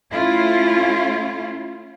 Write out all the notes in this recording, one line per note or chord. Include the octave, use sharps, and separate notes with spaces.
A3 C#4 E4 F4